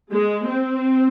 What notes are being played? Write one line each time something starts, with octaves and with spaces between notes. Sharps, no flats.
G#3
C4